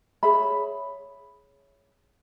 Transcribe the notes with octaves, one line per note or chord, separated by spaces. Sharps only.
G#4 C#5 E5 B5